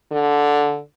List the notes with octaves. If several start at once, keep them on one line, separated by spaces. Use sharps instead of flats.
D3